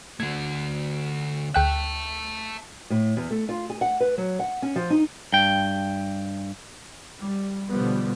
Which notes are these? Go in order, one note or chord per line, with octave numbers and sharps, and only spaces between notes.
D3 A3 G#6
D2 E5 G5 A5 F#6
A2
E2
A3
F4
G#4
F#5
B4
F#3
F#5
C#4
F3
D#4
G2 G5
G3
B2 D3 F3 G3 B3